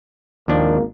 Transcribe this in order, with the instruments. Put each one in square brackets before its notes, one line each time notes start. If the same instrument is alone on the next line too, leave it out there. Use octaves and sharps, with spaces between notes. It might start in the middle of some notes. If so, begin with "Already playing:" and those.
[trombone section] G#1 A#3 [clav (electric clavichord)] D#2 F3 D4